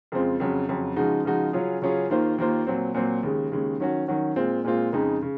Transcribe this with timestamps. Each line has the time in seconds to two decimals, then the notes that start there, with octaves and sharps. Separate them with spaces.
0.12 F2 C#3 G#3 C4 F4
0.40 F2 C#3 F#3
0.69 F2 C#3 F#3
0.96 C#3 F3 G#3 D#4 F#4
1.25 C#3 F3 G#3 D#4 F#4
1.53 C#3 F#3 C#4 F4 G#4
1.82 C#3 F#3 C#4 F4 G#4
2.09 D#2 D#3 A#3 F4 C5
2.38 D#2 D#3 A#3 F4 C5
2.67 A#2 F#3 C4
2.94 A#2 F#3 C4
3.23 D#2 C#3 G#3
3.51 D#2 C#3 G#3
3.80 D#3 F#3 C#4 F#4
4.08 D#3 F#3 C#4 F#4
4.36 A#2 G#3 C4 F4
4.64 A#2 G#3 C4 F4
4.92 F2 C#3 G#3 D#4
5.22 C#3